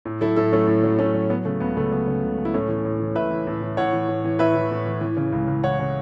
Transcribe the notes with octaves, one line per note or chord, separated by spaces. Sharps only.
A2
F#3 E4 A4
A2 E4 A4
F#3 A3 C#4
A2
F#3
A2 A3 C#4
F#3
F#3 B3
C#3 A3
C#2 B3
C#2 A3
F#3 B3
C#3
C#2
C#2
E4
A2 A3 C#4
E3
A2
E3
A2 B4 E5
E3
A2
E3
A2 C#5 F#5
E3
A2
E3
A2 B4 E5
E3
A2
E3
E3
C#3
C#2
C#2
E3 C#5 F#5
C#3